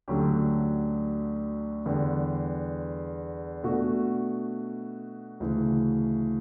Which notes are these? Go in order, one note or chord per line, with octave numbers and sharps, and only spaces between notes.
D2 D3 F#3 C#4 G4
E2 D3 G3
B2 A3 D4 F#4
D2 C#3 E3